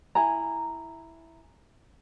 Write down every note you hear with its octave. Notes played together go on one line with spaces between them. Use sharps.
E4 G#5 A#5